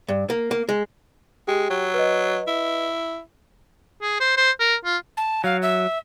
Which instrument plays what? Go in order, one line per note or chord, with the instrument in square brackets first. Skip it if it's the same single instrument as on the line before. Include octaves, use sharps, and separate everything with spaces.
[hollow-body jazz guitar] G2
A#3
A#3
G#3
[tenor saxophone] G#3 [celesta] G4 G5
[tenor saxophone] F#3
[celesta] B4 D#5
[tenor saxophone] E4
[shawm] G#4
C5
C5
A#4
F4
[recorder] A5
[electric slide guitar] F#3 [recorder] F5
[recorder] E5